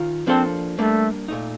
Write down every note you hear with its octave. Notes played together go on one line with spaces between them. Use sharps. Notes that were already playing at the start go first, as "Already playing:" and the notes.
Already playing: D#3 F4
F3 A#3 C4 D4 A4 C5
G3 A3 A#3 D4
A#2 A3 D#4